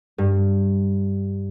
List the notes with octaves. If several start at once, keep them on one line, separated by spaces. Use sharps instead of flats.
G2